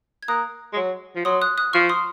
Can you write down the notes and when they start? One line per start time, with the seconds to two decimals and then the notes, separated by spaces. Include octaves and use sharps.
0.23 G#6
0.28 A#3 D#6 F#6
0.73 G#3
0.76 F#3
1.16 F3
1.25 F#3 C6 D#6
1.41 D#6 F#6
1.58 D#6 F#6
1.73 F3 C#6 F6
1.90 C6 D#6